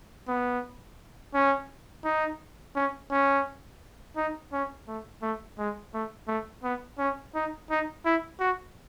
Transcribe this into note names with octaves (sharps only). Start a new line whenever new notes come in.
B3
C#4
D#4
C#4
C#4
D#4
C#4
A3
A3
G#3
A3
A3
B3
C#4
D#4
D#4
E4
F#4